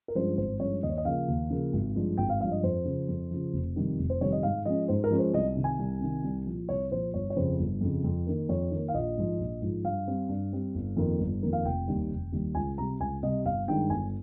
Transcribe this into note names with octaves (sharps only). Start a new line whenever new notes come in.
A#4
G2 F3 G#3 C#4 C5
G#1 C5
G2 F3 G#3 C#4 C#5
D#2 D#5
C#5
D#5
C#3 F3 A#3 F5
D#2
C#3 F3 A#3
G#1
G2 F3 G#3
G#1 G5
F5
G2 F3 G#3 F5
D#5
F2 C5
C#3 F3
F2
C#3 F3
F1
F2 C3 D#3 G3
F1
C5
F2 C3 D#3 G3 C#5
D#5
G#2 F5
F3 G#3 C#4 D#5
G#2 C5
A#4
F3 G#3 C#4
C5
C2 D#5
C3 D#3
G#5
C2
C3 D#3
C2
A#2 F3
C2 C#5
A#2 F3 C5
G1 C#5
C#5
F2 C#3 C5
G1
F2 C#3
F2
D#3 A#3
F2 C#5
D#3 A#3
F5
A#1 D#5
G#2 F3
A#1
G#2 F3
G2 F5
G3 C4
G2
G3 C4
G1
F2 D#3 A#3
G1
F2 D#3 A#3
F5
F1 G5
D#2 D#3 G3
F1
D#2 D#3 G3
C#2 G#5
C3 G3 A#5
C#2 G#5
C3 G3 D#5
G1 F5
G2 D#3 G#3 D#4 G5
G1 G#5